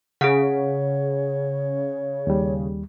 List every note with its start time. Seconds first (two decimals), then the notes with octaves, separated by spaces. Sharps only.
0.21 C#3 G#4 F#5
0.42 C#5
2.27 D#2 G3